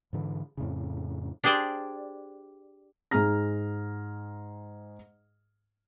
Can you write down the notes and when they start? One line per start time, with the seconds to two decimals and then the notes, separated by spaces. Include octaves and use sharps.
0.13 G#2 D3 E3
0.57 F2 A2 C#3
1.44 D4 G4 G#4 C5 D5
3.11 G#2 G#4 A#5 F6 A#6